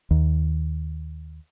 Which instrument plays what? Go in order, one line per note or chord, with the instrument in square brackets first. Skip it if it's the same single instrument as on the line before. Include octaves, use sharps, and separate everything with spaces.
[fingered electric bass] D#2